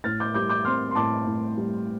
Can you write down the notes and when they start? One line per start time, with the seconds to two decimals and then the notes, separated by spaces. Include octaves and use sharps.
0.04 A2 F6 A6
0.20 D6 G6
0.34 G3 D6 G6
0.49 D6 G6
0.65 C4 C6 F6
0.91 C6
0.95 A2 A5 D6
1.26 A2
1.57 G3